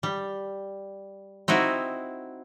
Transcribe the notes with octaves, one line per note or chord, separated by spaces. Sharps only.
G3
C4 D#4 E4 F#4